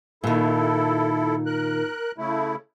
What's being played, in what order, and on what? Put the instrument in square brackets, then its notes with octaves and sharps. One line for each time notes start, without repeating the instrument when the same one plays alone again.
[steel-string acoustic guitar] A#2 D#3 [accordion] E4 A4
[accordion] A#4 F#6
C#3 A3 E4